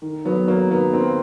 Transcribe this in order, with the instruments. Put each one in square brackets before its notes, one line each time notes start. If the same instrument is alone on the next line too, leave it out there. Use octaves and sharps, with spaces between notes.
[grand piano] D#3
[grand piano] F#3 [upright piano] B3
[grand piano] F#3 [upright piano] A#3
[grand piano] D#3 [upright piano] B3
[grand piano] A#3 [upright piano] C4